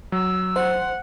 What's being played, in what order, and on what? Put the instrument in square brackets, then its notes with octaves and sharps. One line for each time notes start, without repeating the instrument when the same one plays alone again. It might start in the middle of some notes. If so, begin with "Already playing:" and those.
[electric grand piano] F#3 [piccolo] E6
[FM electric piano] C5 [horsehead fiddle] F#5